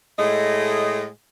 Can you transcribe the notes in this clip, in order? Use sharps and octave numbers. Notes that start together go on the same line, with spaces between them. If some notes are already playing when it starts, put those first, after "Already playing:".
A2 G#3 A3 D#5